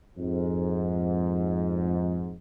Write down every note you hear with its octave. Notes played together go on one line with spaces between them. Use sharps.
F2 G#2